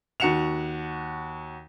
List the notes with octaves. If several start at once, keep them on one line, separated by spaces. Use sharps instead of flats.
D#2 F#4 F#5 C#7 E7 F7